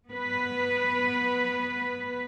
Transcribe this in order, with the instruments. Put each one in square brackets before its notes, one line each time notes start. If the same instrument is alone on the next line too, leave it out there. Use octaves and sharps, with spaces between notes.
[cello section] B3 B4